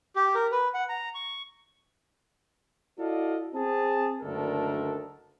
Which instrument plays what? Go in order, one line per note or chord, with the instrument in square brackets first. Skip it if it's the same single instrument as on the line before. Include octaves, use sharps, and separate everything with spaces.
[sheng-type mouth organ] G4
A#4
B4
F#5
A#5
C#6
[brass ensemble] E4 F#4 A4 D5 D#5 F5
C4 G#4 A5
F#1 D2 D#3 D4 A4 A#4